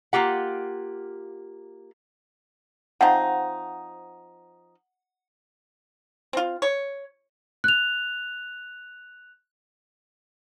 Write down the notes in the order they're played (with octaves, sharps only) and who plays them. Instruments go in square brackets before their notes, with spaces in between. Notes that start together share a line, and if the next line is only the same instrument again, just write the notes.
[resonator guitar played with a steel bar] A#3 F4 G4 F#5
[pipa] F3 C4 D#4 [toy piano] F#5
[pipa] C4 F4
C#5
[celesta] F#6 F7